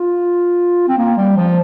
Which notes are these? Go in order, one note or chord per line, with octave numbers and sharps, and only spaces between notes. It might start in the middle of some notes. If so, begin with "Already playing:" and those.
Already playing: F4
C4
A#3
G3
F3